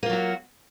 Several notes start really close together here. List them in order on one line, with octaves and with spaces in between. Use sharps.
A#3 F4 F#3 F#4